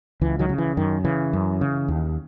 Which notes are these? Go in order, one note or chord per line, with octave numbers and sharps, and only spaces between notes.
C#2 E3
D#3 F#3
C#3
E3
F#2 D#3
C#3 E3
F#2
C#3
D#2